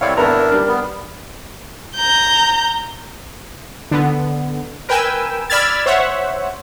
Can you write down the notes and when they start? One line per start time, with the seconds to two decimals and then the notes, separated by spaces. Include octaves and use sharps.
0.01 C2 C4 E4 C#5 D5 F5
0.17 G#1 B3 D4 E4 A#4 A#5
0.52 G3 D4
0.68 B3
1.97 A#5 G6
3.91 D3 B3
4.89 A#4 B4 G5 G#5 E6
5.50 D5 B5 E6 F6 G#6 A6
5.86 C5 C#5 E5 F#5